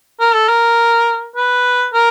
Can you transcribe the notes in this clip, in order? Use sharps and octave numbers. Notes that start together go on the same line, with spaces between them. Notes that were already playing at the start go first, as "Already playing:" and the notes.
A#4
A4
A#4
B4
A#4